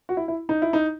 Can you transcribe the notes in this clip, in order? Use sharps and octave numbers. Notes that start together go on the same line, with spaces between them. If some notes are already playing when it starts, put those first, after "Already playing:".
F#4
E4
E4
D#4
E4
D#4